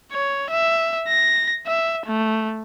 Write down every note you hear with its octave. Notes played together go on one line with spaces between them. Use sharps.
C#5
E5
A#6
E5
A3